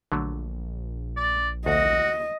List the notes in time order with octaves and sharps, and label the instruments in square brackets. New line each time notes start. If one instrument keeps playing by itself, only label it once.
[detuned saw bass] A#1 [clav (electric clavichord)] D3 F#3 A3
[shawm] D5
[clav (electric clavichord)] D2 [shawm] F#4 [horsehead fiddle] D#5